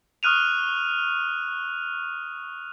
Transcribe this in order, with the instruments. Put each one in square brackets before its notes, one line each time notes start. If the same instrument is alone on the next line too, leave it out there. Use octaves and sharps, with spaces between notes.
[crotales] C#6 D#6 F6 F#6 D#7 F7